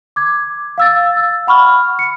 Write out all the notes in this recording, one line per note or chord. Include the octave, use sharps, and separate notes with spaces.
D6 G#6
F5 E6 A6
E6
F#5 B5 C#6 F6
C#7